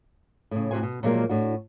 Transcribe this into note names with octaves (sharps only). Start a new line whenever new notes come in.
A2 C#3
A2 C3 F#3 F#4 C5 G#5
B2
A#2 F3 F#3 G#3 A#3
A2 D4 F#4